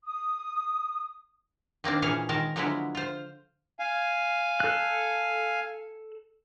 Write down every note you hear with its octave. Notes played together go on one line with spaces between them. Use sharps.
D#6
D#3 A#3 C4 D4
A#2 E3 C#4 G#4 F5 G#5
D#3 G#3 C4 A#4 A5
D3 F3 F#3 G#3 B3 E4
F4 C5
F5 G#5
A4 F#6